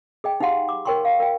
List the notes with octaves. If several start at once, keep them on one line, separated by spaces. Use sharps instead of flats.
G#4 D#5 G5
D#4 G4 F5 F#5 C6
D6
A#4 C#5 G5 C6 C#6
F5
A#4 G5